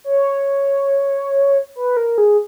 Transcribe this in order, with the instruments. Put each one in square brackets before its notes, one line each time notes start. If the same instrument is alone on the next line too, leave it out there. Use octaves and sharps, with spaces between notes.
[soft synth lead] C#5
B4
A#4
G#4